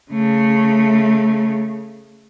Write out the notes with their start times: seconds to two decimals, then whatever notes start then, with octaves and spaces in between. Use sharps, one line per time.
0.11 C#3 A3